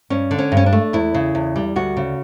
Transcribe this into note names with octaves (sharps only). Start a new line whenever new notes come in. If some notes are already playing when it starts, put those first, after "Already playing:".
G2 C#4
D3
C#4
G2
C#4
D4
A3
E2 E4
C#3
E2
G3
D2 F#4
C#3